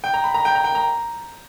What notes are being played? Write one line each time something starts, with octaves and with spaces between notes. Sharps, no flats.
G5
A#5
B5
A#5
G5
A#5
G5
A#5